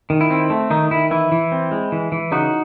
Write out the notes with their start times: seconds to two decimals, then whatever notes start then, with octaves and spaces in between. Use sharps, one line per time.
0.10 D#3
0.21 E4
0.30 C4
0.50 A3
0.70 D#3 D#4
0.91 D#3 E4
1.11 E3 E4
1.32 E3
1.52 C4
1.71 G#3
1.92 E3
2.12 E3
2.31 C#3 D#4 F#4